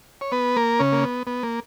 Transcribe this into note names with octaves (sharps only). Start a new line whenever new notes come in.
C#5
B3 B4
A#3 A#4
C#3 C#4
A#3
B3
B3
A#3